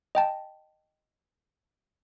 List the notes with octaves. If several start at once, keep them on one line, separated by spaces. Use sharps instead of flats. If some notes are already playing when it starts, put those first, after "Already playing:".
D#5 G5 A5